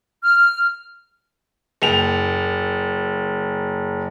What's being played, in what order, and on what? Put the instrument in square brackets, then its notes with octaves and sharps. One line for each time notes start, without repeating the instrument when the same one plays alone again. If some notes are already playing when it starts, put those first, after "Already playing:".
[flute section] F6
[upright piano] F#1 G5 F7